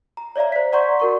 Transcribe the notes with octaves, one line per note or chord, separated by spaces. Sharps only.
A#5
C#5 D5 E5 F5 A#5
C5 B6
D5 F#5 A#5 C6 C#6 G6
F#4 A#4 C#6